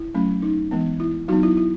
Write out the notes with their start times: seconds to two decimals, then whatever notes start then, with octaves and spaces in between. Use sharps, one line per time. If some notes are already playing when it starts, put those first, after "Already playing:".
Already playing: E4
0.14 F#3 A3 C#4
0.42 D#4
0.71 E3 G#3 B3
1.00 E4
1.28 F#3 B3 D#4 F#4
1.43 E4
1.57 E4